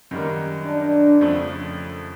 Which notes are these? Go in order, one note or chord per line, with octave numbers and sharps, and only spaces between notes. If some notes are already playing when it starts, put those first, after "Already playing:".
F#2 D#3 G3 A#3
D4
F2 C#3 F3 A3